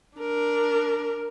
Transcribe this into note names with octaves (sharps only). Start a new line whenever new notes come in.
D4 A#4